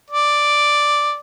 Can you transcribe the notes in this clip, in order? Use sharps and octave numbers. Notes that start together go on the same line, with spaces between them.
D5